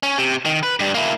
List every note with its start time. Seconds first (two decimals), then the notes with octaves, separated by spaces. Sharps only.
0.03 C#4
0.18 C3
0.46 D#3
0.63 B4
0.80 G2 G3
0.94 A#3 E4